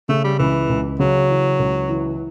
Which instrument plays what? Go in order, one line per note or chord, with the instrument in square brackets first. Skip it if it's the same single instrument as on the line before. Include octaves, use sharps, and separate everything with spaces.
[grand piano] C#3 [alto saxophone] A3
[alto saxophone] G3
[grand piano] C#2 [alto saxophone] E3
[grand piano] C#2
[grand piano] C#3 [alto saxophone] F#3
[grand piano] E3
C#2
E3